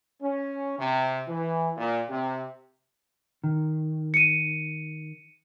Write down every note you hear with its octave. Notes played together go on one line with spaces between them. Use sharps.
C#4
C3
E3
A#2
C3
D#3
C#7 D#7